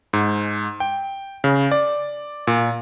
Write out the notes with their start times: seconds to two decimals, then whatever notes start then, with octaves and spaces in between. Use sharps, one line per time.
0.13 G#2
0.80 G5
1.44 C#3
1.71 D5
2.47 A#2